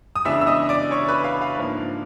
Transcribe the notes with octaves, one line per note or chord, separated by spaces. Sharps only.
D#6
C#3 E3 G#3 B3 D4 E5 E6
E6
D#5 D#6
D5 D6
C#5 C#6
B4 B5
F5
F5
G#2 F3 A#3 D4